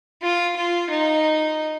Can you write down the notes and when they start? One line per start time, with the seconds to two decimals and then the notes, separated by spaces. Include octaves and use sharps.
0.22 F4
0.57 F4
0.90 D#4